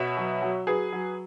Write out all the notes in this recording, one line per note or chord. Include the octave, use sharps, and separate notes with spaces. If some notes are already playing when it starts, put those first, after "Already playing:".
Already playing: B2 C#5 E5
F#3
F#3
F#3 G#4 B4
F#3